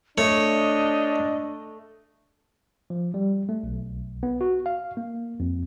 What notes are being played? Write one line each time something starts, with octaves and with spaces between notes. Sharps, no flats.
A3 D4 C#5 D#5
F3
G3
A3
B1
B3
F#4
F5
A#3
F2